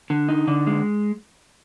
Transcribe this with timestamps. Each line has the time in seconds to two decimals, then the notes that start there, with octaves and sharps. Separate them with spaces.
0.10 D3
0.29 D#4
0.48 D3
0.67 G#3